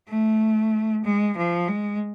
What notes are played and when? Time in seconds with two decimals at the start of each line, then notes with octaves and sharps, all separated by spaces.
0.08 A3
1.04 G#3
1.37 F3
1.68 G#3